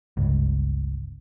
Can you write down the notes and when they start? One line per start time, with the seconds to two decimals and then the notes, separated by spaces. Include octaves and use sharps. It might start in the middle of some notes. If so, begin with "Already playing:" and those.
0.17 G1 C#2